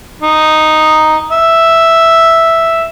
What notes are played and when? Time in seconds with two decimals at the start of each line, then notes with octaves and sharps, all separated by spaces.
0.21 D#4
1.32 E5